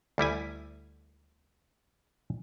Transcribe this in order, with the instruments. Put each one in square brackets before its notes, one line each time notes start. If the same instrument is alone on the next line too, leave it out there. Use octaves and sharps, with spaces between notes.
[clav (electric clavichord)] D2 G3 E4 G#5